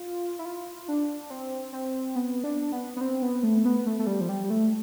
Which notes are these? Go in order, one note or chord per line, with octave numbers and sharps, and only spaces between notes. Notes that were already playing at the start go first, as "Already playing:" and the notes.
Already playing: F4
E4
F4
D4
C4
C4
B3
D4
B3
B3
C4
B3
A3
B3
A3
A3
G3
F3
G3
G3
A3